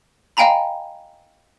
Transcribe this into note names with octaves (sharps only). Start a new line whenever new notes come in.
D#5 F5 G5 G#5 A#5 B5